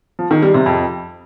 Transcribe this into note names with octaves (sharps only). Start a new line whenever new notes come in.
F3
D#3
G3
C3
F2